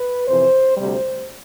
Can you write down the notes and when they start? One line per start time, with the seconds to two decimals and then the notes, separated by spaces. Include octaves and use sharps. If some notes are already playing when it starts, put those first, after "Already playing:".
Already playing: B4
0.27 F2 C3 E3 C5
0.77 D2 C3 G3 C5